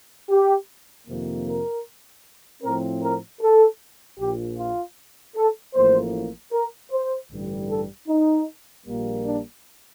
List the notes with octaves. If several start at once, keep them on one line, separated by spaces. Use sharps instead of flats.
G4
F2 C3 D#3 A#3
A#4
A2 F3 C4 A#4
A#4
A4
A#1 A#2 F3 G4
F4
A4
A1 A2 F3 A#3 C5
A#4
C5
A1 G2 D3 G3
A4
D#4
A#1 A#2 G3 A#3
D4